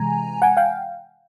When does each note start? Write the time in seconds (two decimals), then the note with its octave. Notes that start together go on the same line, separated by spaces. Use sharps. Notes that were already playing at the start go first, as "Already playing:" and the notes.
Already playing: C3 E3 G#3 G#5 A#5
0.42 F#5 G#5
0.57 F5 G5